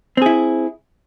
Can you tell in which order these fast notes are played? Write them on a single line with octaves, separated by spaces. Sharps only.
C4 G#4 E4